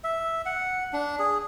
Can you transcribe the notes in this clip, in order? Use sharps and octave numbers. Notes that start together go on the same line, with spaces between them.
E5
F#5
D4
G#4